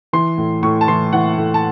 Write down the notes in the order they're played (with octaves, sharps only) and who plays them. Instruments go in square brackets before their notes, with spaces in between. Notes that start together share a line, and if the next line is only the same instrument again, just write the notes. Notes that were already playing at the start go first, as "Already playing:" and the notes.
[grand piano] E3 C6
A2
A2 C#6
A5
E3 C6
E3 F#5
A2
A5